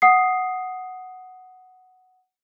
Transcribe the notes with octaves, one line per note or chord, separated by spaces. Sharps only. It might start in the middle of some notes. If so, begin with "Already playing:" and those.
F#5 D#6 C7